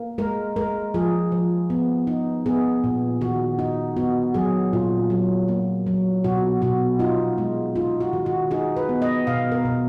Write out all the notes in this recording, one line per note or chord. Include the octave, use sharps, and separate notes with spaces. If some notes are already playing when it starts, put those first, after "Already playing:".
Already playing: A#3
G#3 A#4
G#3 A#4
F3 G#4
F3
B3
D#4
B3 G#4
A#2
D#3 F#4
D#4
B3 F#4
F#3 G#4
A#2 F4
F#3
A#3
F#3
B2 F#4
B2 F#4
D#4 F4
G#3
D#4 F4
F#4
D#3
F#4
D#4 G#4
B4
B3
D#5
B2 F5
A#4
B2